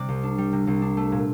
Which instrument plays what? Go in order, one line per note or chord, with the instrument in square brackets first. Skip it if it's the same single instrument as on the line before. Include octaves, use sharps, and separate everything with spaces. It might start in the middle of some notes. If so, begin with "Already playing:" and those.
Already playing: [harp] C3 G3 D5
C2
D4
G3
C3
C2
D4
A3
A#2